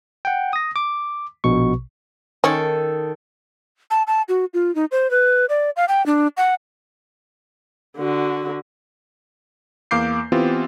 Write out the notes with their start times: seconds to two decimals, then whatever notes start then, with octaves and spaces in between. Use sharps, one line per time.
0.25 F#5 G5
0.53 D#6 A#6
0.76 D6
1.44 A#1 B2 C#6
2.44 D#3 C#4 A4
3.91 A5
4.07 A5
4.29 F#4
4.54 F4
4.75 D#4
4.92 C5
5.11 B4
5.49 D5
5.76 F5
5.88 G5
6.06 D4
6.37 F#5
7.97 D3 F#4
9.91 E2 A#3 F5 D6 G6 C7
10.32 E3 B3 C4 F4 G4